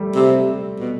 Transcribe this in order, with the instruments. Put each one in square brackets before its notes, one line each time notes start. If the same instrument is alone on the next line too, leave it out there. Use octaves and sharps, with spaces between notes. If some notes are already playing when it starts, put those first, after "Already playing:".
Already playing: [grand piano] G3 A3
[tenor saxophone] C3
B2